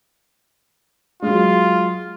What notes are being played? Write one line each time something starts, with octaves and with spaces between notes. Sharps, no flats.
F#3 G#3 F4